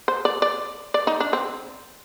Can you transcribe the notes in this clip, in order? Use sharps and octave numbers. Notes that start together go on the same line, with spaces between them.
C5
D5
D5
D5
D#4
D4
C4